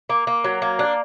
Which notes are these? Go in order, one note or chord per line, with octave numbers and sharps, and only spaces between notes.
A#3
A#3
F#3
A#3
D4